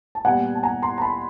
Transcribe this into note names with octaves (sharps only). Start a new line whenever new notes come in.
A5
A#2 G3 B3 F#5 G#5
A5
G#5 A#5
A#5 C6
A#5
A5 B5